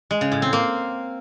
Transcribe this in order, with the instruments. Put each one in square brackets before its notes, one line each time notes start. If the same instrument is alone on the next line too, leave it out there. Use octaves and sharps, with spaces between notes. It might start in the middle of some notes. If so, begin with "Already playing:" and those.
[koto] G#3
C#3
A2
C4
A#3